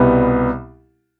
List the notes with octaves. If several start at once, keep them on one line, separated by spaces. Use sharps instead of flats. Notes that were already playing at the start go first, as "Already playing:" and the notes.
Already playing: C2 B2 G3 B3